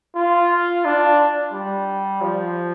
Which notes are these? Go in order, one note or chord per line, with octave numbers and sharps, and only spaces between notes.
F4
D4
G3
F3